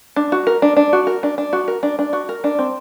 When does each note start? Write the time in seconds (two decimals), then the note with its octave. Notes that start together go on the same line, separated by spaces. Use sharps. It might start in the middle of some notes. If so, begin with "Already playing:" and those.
0.16 D4
0.32 F#4
0.47 A#4
0.62 D4
0.77 D4
0.93 F#4
1.07 A#4
1.23 D4
1.38 D4
1.53 F#4
1.68 A#4
1.83 D4
1.99 D4
2.13 F#4
2.29 A#4
2.44 D4
2.59 C4